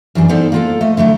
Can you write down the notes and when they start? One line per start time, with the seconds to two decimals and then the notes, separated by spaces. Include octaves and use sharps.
0.15 F#2 E3 G3 D4
0.29 G3 B3 C4 D#4 A4 C5
0.52 A#3 F4 A4
0.81 A3 D#5
0.97 D3 F#3 A3 E4